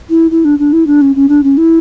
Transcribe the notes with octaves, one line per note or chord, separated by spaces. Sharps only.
E4
E4
D4
D4
E4
D4
C#4
C#4
D4
C#4
E4